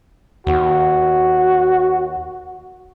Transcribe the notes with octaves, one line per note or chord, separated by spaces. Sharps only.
D#2 F#4